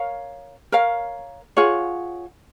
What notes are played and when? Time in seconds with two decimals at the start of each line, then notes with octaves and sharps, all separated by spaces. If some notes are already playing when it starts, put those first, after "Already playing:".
Already playing: A#4 C#5 F5
0.72 A#4 C#5 F5
1.57 F4 G#4 C#5 F#5